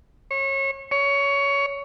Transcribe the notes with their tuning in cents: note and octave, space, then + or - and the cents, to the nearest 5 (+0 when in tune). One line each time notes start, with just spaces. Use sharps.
C#5 -30
C#5 +15